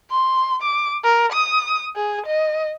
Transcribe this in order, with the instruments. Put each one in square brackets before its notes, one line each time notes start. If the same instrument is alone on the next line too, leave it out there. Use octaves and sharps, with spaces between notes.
[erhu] C6
D6
A#4
D#6
G#4
D#5